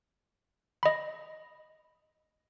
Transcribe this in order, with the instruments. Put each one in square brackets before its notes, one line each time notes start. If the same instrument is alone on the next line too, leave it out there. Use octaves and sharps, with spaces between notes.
[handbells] D#5 B5